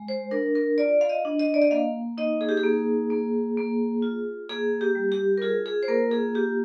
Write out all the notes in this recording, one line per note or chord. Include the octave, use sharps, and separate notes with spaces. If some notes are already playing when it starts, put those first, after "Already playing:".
Already playing: G#3
C5
D4 A#4
A#4
F4 D5
F5
D#5
D4
D#5
D5
D#5
A#3 F5
D#4 D#5
G#4
G4
G#4
A#3
A#3
A#3
F4
A#3 G#4
G4
G3
G4
A#4
F4 G#4
G#4
C5
A#3 A#4
G#4
F4 G4